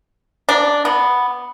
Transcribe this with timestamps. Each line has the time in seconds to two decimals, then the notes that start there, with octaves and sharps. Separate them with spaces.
0.49 D4
0.85 B3